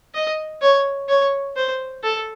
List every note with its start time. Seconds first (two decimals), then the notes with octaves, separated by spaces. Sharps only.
0.15 D#5
0.62 C#5
1.09 C#5
1.56 C5
2.03 A4